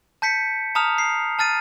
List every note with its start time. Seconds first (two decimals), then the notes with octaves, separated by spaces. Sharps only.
0.22 A5 G6 B6 C#7
0.75 A5 A#5 D#6 F6 F7
0.98 C7
1.39 A5 F6 A6 D#7